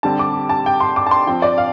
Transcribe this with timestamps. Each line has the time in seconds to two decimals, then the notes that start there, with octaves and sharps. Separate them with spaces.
0.03 D3 G3 C4 A5
0.19 D6
0.49 A5
0.66 G5
0.80 C6
0.96 D6
1.07 A5
1.11 C6
1.27 F3 C4 G5
1.42 D5
1.58 F5